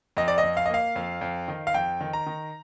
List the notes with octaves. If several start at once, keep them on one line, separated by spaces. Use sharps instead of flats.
F2 D#5
D5
D#5
F2
F5
D#5
A#3 F5
F2
F2
D#3
F5
F2 G5
D#3
A#5
D#3